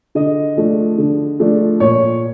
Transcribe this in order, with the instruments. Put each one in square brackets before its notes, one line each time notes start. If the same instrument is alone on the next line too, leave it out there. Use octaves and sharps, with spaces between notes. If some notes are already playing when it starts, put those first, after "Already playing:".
[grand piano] D3 D#5
F3 A3 D4
D3
F3 A3 D4
A#2 C#5